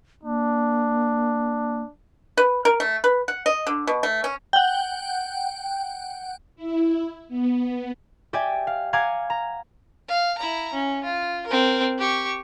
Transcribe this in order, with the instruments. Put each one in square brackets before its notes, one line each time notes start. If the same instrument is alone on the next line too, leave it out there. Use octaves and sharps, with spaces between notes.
[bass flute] A#3 [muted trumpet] D4
[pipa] B4
A#4
A3
B4
F#5
D#5
D3
B2
A3
C#4
[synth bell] F#5 G5
[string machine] E4
B3
[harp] G4 D5 E5 G5 G#5
F5
F5 F#5 G#5 A#5 D6 G#6
A#5
[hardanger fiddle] F5
E4 A#5
C#4
F4
C4 A#4
G4 C#6